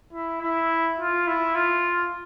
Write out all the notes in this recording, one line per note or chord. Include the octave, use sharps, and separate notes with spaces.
E4
E4
F4
E4
F4